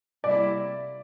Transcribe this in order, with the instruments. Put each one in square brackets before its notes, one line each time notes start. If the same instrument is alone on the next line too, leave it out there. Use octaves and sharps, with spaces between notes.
[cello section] C3 G3 A#3 E4 [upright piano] D5